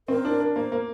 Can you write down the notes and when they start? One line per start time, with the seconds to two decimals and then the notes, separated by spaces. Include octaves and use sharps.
0.08 C4 A#4
0.25 D4
0.40 D4
0.56 A#3 C5
0.72 A#3